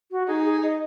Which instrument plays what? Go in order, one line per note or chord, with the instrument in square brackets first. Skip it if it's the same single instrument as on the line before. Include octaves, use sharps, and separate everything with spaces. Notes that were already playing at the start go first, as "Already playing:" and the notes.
[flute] F#4
[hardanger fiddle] D#4 [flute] G#4
[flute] G#4
D#5